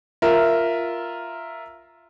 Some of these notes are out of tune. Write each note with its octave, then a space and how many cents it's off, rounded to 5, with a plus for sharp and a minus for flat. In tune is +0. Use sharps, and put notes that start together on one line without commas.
F4 -5 A#4 +0 E5 +0